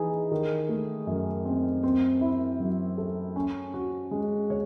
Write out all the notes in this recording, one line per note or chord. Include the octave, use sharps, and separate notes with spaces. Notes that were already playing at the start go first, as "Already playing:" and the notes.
Already playing: E3 D#4 G#4
D#3
A3
F#2
C4
C4
E4
F#3
A4
C#4
F#4
G#3
C#5